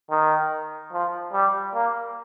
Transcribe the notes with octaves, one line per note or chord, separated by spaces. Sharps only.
D#3
F3
G3
A#3